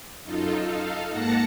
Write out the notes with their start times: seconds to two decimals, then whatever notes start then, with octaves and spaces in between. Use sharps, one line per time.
0.23 F#2 D#4 F4 A4
0.63 D#4 A4 F5
1.10 G#2 A#3 F#5 A5 A#6 C#7